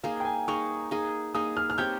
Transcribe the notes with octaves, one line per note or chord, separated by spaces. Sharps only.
A#3 D#4 G#4 F5
G5
G#5
A#3 D#4 G#4 C#6
A#3 D#4 G#4
A#3 D#4 G#4 D#6
F6
F6
C4 G4 C#5 G6